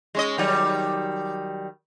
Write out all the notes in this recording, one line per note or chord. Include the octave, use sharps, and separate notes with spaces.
G#3 C#4 D#5
D#3 F#3 G3